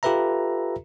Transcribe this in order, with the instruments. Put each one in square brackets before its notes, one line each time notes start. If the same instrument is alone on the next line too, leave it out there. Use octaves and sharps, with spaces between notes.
[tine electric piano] F4 G4 A4 B4 E5 A#5